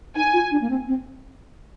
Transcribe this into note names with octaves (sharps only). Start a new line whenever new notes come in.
D#4 G#5
F4
D4
A#3
C4
C4